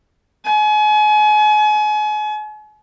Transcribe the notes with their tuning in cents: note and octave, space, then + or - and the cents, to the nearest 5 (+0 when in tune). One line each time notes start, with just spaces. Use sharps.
G#5 +35